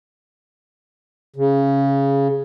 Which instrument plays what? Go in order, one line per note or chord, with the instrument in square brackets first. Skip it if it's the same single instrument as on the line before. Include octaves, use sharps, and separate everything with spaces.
[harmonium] C#3